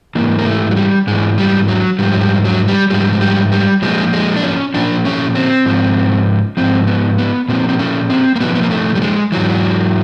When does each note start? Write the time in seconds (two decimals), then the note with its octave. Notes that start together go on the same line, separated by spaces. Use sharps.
0.15 G#2 E3 A#3
0.39 A#3
0.46 A3
0.71 F#3
0.76 G3
1.07 G#2 E3 G#3
1.38 G3
1.68 F#3
1.99 G#2 F3 G3
2.14 F#3
2.21 G3
2.45 F#3
2.68 G3
2.90 G#2 F3 G3
3.13 G#3
3.21 G3
3.52 G3
3.82 A#2 F3 G#3
4.13 G#3
4.36 D4
4.43 C#4
4.74 A#2 F3 D4
5.05 C#4
5.35 C4
5.66 G#2 F3
6.57 G#2 F3 C4
6.87 B3
7.18 B3
7.48 A#2 F3 C4
7.69 C4
7.79 C#4
8.10 C4
8.36 A#3
8.40 A#2 F3 B3
8.55 B3
8.63 A#3
8.71 A3
8.95 G3
9.02 G#3
9.32 G#2 E3 F#3